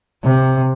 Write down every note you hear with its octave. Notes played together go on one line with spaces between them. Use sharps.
C3